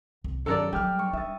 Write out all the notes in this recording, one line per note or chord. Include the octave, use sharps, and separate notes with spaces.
C2
G2 D#3 F#3 C#4 D#4 A4 A#4 D5
F#3 G3 A3 G5 D6 F6
G2 C#6
D#4 E5 D#6 A6